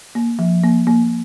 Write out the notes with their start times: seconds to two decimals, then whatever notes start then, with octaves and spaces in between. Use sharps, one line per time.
0.15 A#3
0.39 F3
0.64 A#3
0.87 A#3